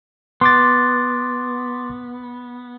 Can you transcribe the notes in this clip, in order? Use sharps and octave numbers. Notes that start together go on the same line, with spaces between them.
B3 C6 D6 A6